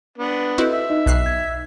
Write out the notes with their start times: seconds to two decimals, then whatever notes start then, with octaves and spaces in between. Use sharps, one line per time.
0.18 B3 D4
0.58 C4 E4 F#4 A4 B4 D#5
0.73 E5
0.90 D#4 D#5
1.06 B1 F#6 C7
1.26 G#6